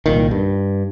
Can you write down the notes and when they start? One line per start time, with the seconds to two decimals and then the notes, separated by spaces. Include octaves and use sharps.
0.06 C2 A#2 D#3
0.31 G2